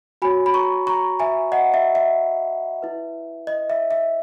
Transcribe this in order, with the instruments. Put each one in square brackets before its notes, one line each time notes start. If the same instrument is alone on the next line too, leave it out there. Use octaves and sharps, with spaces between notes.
[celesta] F#4 C#5 G#5 B5
B5
A#5 C#6
A#5 C#6
E5 G#5
D#5 F#5
E5
E5
E4 B4
D#5
E5
E5